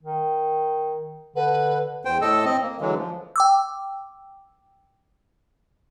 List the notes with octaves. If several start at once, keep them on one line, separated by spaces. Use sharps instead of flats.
D#3
D3 B4
E2 C5 G5
A2 A4 D#5 E6
C4 D#5
A#3
D3 E3 F#3 G#3
F3
G5 D6 E6